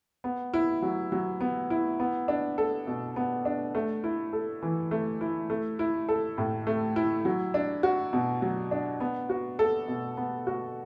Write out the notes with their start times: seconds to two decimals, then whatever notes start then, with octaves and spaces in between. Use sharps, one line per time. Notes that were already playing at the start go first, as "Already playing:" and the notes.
0.24 B3
0.54 E4
0.82 F#3
1.12 F#3
1.41 B3
1.70 E4
2.00 B3
2.28 D4
2.58 A4
2.87 B2
3.16 B3
3.45 D4
3.75 A3
4.04 E4
4.33 A4
4.63 E3
4.91 A3
5.21 E4
5.50 A3
5.79 E4
6.09 A4
6.38 A2
6.67 A3
6.96 E4
7.25 F#3
7.54 D4
7.83 F#4
8.13 B2
8.42 F#3
8.71 D4
9.00 B3
9.29 F#4
9.59 A4
9.88 B2
10.17 B3
10.47 F#4